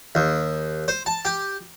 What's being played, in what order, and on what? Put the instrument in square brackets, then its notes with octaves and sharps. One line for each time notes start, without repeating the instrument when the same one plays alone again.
[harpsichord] D#2
C5
A5
G4